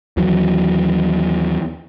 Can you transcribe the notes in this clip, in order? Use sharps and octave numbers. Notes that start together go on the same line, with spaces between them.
D#2 E3 F#3